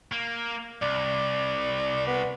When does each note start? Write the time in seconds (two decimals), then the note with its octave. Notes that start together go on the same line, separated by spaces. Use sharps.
0.12 A#3
0.82 C2 D5
2.07 B3